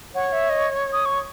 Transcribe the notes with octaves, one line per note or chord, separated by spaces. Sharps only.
C#5 F#5
E5
D#5
D#6
C#6